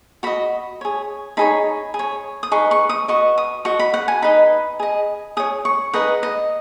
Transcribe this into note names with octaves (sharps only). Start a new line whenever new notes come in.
F#4 D#5 B5
G#4 C#5
D#4 G#4 C#5 B5
G#4
C#5
D#6
D#4 G#4 B4 C#6
C#6
D#6
F#4 B4 D#5 C#6
D#6
F#4 D#5 C#6
B5
F#5
G#5
D#4 B4 D#5 B5
G#4 D#5
G#4 C#5 D#6
C#6
D#4 G#4 B4 D#5 F#5
D#5